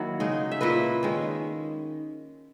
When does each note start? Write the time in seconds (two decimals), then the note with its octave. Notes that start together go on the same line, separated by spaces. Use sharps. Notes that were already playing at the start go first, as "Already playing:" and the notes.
Already playing: D#3 F#3 A#3 E4
0.20 C#3 G#3 D#4
0.51 E5
0.61 A#2 A#3 E4 B4 D#5
1.03 D#3 G#3 C#4